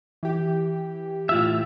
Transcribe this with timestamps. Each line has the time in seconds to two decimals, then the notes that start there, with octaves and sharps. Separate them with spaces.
0.23 E3 G4
1.29 A2 F4 E5